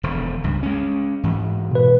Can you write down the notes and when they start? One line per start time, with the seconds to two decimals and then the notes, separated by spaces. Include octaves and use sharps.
0.03 E1 D3 F3
0.44 C#2 G2
0.63 G#3 C#4
1.23 G#2 E3
1.71 B2 B4